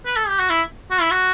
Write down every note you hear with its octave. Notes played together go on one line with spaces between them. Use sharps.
B4
A4
G4
F#4
E4
F#4
E4
F#4